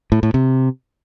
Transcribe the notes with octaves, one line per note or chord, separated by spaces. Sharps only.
A2
A2
C3